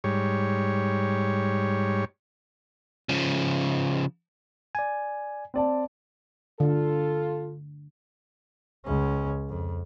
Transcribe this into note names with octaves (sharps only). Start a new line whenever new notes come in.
G#2 G3 C#5
C#3 F3
D5 G#5
C4 D5 A5
D3 F4 A4
C#2 C#4
F2